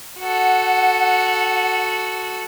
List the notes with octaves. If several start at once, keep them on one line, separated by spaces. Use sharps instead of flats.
F#4 A4 F#5